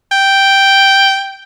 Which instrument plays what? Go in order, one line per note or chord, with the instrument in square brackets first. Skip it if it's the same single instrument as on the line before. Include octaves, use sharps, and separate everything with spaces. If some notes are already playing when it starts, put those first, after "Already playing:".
[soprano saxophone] G5